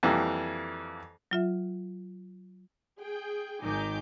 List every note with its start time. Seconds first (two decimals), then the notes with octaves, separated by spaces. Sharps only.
0.03 F2 E3 G3 A#3
1.31 F#3 F4 E5
3.00 G#4 G5
3.63 G#1 D#3 D#4 G#5 D6 G6